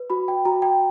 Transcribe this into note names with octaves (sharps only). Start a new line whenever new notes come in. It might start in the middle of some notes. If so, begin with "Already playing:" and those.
Already playing: B4
F#4 B5
G5
F#4 A#5
G5